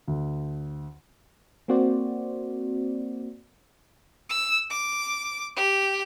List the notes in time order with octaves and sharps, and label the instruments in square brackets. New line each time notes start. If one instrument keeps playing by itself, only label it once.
[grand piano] D2
[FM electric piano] A#3 C4 F#4 C5 D5
[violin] E6
D6
G4